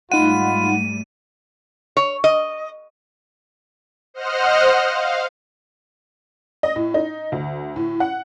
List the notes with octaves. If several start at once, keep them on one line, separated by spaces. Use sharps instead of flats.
G#2 G3 A3 D#4 F4 F#5 B5 D#7
C#5
D#5
C5 D#5 F#5 F6
F5
D#5
A2
D#4
D2
A2
F#5